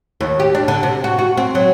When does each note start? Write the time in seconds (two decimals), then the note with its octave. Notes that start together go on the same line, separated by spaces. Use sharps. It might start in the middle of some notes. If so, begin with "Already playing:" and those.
0.21 D#2
0.40 G4
0.55 D4
0.68 D3
0.83 C3
1.04 F#4
1.19 F#4
1.37 C4
1.55 F#3